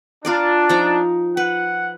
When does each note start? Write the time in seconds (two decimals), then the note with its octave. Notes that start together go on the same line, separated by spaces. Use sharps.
0.25 D4 F4 A#4 D5
0.69 F3 D#4 A#5
1.37 B4 F#5